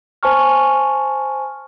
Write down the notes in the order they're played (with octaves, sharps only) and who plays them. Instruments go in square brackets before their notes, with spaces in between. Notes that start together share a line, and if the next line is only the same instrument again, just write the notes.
[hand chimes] C5 G#5 A5 C#6 F6